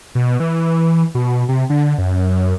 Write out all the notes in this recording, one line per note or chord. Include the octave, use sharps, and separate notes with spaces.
B2
E3
B2
C3
D3
F#2